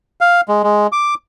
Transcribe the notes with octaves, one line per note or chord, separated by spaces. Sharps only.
F5
G#3
G#3
D6